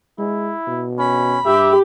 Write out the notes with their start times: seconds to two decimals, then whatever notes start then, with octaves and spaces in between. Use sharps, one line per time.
0.19 G#3 E4
0.68 B2
0.98 C#4 B5
1.45 G2 G4 E5